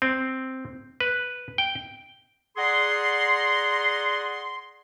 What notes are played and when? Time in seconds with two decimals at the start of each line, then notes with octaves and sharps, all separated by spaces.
0.02 C4
1.00 B4
1.58 G5
2.57 G#4 D5 F#5 A#5 C6